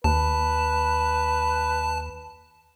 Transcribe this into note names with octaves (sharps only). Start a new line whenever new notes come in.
D#2 B4 A5